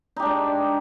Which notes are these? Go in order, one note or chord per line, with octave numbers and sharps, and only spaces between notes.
G#3 D4 D#4 G4